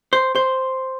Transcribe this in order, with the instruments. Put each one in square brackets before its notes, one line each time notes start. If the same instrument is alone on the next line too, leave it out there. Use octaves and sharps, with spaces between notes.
[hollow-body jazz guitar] C5
C5